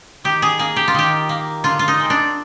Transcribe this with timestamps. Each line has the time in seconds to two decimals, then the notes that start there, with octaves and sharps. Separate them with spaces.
0.24 D#3 G4
0.42 G#4
0.59 A#3 G#4
0.76 G4
0.88 F4
0.94 D#3 G4
1.29 A#3
1.64 D3 F4
1.79 F4
1.88 D#4
1.99 G#3 C4
2.10 D4